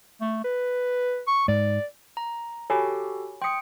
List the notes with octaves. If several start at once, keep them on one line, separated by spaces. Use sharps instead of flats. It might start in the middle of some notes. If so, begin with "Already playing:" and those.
A3
B4
C#6
G#2 D5
A#5
F#4 G4 A4 C#5 G#5 B5
G5 C6 D#6 C#7